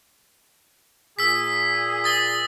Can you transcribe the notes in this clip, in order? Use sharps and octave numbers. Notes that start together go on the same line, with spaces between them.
A#2 G#4 E6 B6
D#6 A6 G7